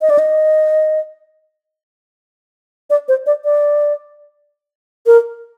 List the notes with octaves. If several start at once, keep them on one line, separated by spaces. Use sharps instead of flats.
D#5
D5
D#5
D5
C5
D5
D5
A#4